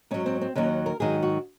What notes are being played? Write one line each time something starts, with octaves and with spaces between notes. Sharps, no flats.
G#2 F#3 C#4
C4
C4
D#2 D#3 F#3 C#4
A#4
G#2 D#3 F#3 G#4
F#4